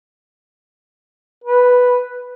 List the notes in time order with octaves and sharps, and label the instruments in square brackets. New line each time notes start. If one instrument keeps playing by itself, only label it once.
[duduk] B4